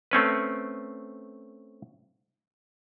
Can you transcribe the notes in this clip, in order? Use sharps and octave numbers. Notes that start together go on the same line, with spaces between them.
A3 C4 C#4 B4